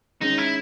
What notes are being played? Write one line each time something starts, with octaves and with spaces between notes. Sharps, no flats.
D#3 G#3 C#4 D#4
E4